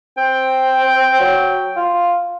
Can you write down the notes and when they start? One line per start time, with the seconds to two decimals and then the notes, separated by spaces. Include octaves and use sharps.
0.17 C4 G5
1.20 F#3
1.76 F4